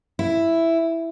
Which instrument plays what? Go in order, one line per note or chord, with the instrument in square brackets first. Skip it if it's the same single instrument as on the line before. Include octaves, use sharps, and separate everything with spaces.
[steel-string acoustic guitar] E4